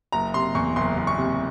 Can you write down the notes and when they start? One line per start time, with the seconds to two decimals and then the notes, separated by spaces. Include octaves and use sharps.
0.12 F#1 A#5
0.34 C3 C6
0.55 E2 C#6
0.76 F#1 C6
0.97 F#1
1.07 C#6
1.18 C3